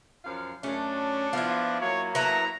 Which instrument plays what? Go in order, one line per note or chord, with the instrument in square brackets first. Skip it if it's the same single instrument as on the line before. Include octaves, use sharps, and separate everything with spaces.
[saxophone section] F#2 F3 F5
[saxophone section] F#2 C#4 [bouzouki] A3 [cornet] D4
[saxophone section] F3 B3 [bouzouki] E4 F4
[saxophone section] F#3 A#3 [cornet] C#5
[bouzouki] B3 E4 A4 [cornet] A#5